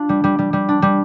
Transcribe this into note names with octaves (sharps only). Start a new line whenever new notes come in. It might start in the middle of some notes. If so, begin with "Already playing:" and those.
Already playing: D4 F4
G3
G3
G3
G3
D4
G3